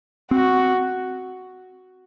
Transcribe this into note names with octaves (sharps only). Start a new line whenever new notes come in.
C4 F#4